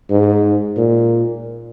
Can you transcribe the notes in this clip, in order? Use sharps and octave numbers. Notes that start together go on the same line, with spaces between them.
G#2
A#2